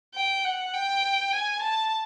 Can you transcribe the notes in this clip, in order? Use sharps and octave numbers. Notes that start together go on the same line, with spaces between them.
G5
F#5
G5
G#5
A5